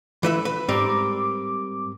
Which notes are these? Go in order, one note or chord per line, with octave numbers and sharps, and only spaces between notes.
E3 B4 E5
B4
G#2 G3 C4 A#4 D6